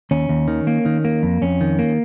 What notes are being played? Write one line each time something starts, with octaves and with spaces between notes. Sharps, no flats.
D#2 C#4
D#2
D#3
A#3
D#3
A#3
F2
F2 C#4
D#3
A#3